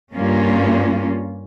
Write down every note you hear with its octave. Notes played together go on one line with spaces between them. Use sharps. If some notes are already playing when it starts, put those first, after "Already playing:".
G2 A#3 C#4 F4